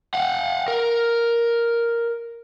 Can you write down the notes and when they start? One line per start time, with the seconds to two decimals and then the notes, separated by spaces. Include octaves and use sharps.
0.14 F5 F#5
0.68 A#4